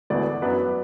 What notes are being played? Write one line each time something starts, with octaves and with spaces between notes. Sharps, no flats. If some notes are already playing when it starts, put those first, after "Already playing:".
E1 D2 D3 B3 D5
F#2 F#3 B3 D4 B4